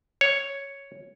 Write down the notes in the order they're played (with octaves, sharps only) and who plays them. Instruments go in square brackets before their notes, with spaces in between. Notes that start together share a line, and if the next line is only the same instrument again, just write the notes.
[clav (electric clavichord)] C#5